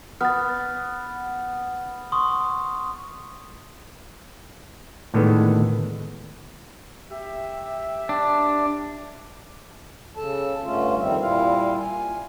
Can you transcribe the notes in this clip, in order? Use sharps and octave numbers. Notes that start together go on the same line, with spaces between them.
B3 F6 A6
C6 C#6 D#6
A2 D3 D#3 G#3 B3 A4
G4 E5
D4
C#3 A4 A5
G2 D3 A3 C#4 F4
F2 D#3 G3 C4 E5
A#2 G3 E4 F4 F5
G#5